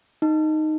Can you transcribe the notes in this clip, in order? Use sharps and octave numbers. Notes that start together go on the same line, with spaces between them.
D#4